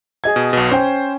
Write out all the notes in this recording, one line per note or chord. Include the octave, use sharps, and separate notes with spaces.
G#4 D#5 G#6
B2
B1 B2
C#4 C5 G5